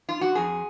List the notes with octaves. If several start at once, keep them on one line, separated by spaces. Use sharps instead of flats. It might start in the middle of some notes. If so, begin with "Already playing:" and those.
F4
F#4
F2 G#4